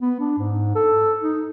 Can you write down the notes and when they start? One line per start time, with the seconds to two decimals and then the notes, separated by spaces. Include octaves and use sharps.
0.01 B3
0.20 D4
0.38 G#2
0.75 A4
1.23 D#4